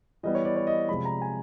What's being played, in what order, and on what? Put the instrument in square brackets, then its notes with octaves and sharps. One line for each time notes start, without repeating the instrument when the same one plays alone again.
[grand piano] E3 G3 B3 D#5
C#5
D5
C#5
D#5
C3 F3 G#3 B5
A#5
G#5